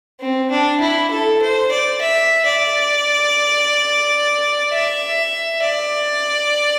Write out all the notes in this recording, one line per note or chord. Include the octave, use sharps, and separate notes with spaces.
C4
D4
E4
A4
C5
D5
E5
D5
E5
D5